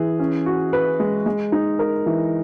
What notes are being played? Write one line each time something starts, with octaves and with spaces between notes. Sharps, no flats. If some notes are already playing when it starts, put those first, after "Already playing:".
Already playing: E3 G#4
C#4
F#4
B4
G#3
G#3
D#4
A#4
E3